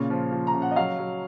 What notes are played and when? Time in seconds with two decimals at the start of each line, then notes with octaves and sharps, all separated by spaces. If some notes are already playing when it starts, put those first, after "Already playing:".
Already playing: A#2 C#3
0.10 F3
0.32 F3
0.47 A#5
0.54 C#3
0.62 F#5
0.71 D#5
0.76 F#3 F5
0.98 F#3